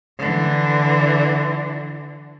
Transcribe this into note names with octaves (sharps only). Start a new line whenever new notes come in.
D3 E3